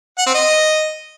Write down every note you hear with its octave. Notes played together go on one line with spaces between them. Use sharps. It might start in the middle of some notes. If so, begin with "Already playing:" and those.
F#5
C4
D#5